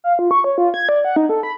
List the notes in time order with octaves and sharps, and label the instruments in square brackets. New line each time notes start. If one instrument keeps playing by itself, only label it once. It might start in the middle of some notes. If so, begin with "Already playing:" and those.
[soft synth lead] F5
F4
C#6
C#5
F4
G#6
D5
F#5
D#4
A4
B5